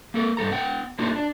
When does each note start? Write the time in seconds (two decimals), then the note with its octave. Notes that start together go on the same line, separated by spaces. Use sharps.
0.14 A#3 A4 A#4
0.37 G2 G3 A4 A#5
0.51 B3 F#5 G5
0.99 A3 A#3 D4 D#4 F4 F#4
1.16 D4